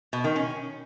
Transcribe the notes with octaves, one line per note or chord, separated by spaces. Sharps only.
B2
D#3
C#4